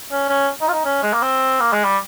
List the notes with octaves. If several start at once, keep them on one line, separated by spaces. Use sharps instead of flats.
C#4
C#4
D#4
F4
D#4
C#4
G#3
A#3
C4
A#3
G#3
G3